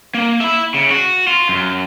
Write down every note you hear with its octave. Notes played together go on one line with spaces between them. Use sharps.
A#3
E5 B5
C#3
F#4
F4
F#2